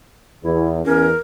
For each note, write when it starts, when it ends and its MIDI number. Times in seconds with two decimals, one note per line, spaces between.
0.44 0.81 40
0.44 0.73 64
0.86 1.12 40
0.86 1.07 61
0.86 1.18 70